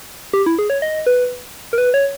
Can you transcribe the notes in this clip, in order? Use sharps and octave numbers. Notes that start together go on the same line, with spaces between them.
G4
E4
G#4
C#5
D#5
B4
A#4
B4
C#5